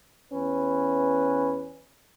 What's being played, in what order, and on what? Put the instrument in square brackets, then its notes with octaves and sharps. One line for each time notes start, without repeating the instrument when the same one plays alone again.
[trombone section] E2 C#4 B4